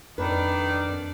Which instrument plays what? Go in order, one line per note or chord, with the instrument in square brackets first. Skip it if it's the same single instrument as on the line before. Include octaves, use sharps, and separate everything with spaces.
[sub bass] F2 [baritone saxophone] D#3 [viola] D4 D5 [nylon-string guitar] B4